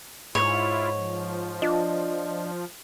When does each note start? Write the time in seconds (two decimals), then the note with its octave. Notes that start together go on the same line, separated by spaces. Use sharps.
0.35 G#2 E4 F4 C#5
0.95 F3
1.62 D4 F4 D#5